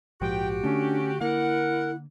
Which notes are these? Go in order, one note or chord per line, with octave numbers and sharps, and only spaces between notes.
A#1 G#2 F3 F#4 G4 G5
D3 A3 C#4 D4
D3 A#3 E4 A#4 F#5